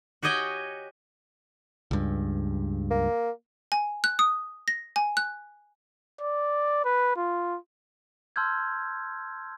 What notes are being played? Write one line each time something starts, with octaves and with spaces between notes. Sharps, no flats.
F#4 G4 C#5 D#5 G5 G#5
C#2 G2
A#3
G#5
F#6
D#6
A#6
G#5
F#6
D5
B4
F4
A5 C6 E6 F6 G6 G#6